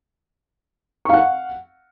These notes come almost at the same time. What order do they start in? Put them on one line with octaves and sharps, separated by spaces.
C#6 F5 F#5